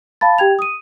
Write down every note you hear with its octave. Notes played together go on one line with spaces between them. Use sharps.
F5 A5 B5 A6
G4 G5 G#6 F7
D#6 D#7